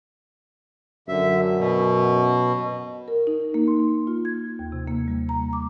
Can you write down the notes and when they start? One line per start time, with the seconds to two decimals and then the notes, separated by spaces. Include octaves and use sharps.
1.08 F#2 D3 E5
1.58 B2
3.08 A#4
3.27 D#4
3.54 A#3
3.68 C6
4.07 F4
4.25 G#6
4.59 D#2
4.72 C3
4.88 A#3
5.08 G3
5.29 A#5
5.53 D6